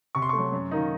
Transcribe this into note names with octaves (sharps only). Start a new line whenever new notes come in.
C3 C#6
C6
A3 C#6
F#3
F#2
D#3 A#3 D#4